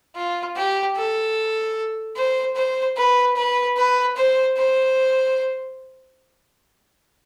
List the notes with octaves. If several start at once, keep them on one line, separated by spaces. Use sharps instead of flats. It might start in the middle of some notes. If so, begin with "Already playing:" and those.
F4
G4
A4
C5
C5
B4
B4
B4
C5
C5